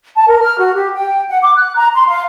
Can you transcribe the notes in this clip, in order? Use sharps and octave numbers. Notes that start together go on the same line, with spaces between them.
A5
A#4
F6
F#4
G4
G5
F#5
D6
F#6
A#5
C6
F5